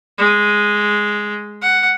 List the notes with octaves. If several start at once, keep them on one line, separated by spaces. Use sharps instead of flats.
G#3
F#5